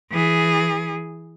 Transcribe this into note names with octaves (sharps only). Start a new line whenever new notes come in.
E3 G#4